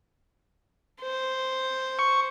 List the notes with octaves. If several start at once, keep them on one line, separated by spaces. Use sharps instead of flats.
C5
C#6